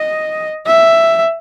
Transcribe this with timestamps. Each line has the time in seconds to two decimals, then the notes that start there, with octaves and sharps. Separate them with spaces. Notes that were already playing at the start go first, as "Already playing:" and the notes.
Already playing: D#5
0.66 E5